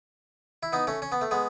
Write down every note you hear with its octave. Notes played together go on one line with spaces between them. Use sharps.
E4
B3 D#4
A3 C#4
C#4
B3
A3
G#3 B3